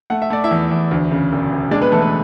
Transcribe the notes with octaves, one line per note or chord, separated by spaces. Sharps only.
A3 F#5
E5
A3 D5
E4 E5
E2
E2
D2
C#3
E1
E1
G#3 D4 D5
B3 B4
E2 A3 A4
B3 B4